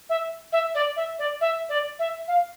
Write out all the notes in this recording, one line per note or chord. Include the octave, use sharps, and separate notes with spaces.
E5
E5
D5
E5
D5
E5
D5
E5
F5